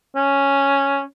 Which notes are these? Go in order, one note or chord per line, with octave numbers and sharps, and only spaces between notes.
C#4